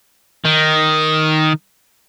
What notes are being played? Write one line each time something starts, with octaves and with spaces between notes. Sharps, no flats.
D#3